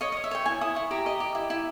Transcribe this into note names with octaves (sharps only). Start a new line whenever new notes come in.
C#5 D#5
D#5
C#5
E5
C#5 G5
E4 G#5
E4 D#6
E4 C#6
G4 A#5
D#5
G4
E4
E4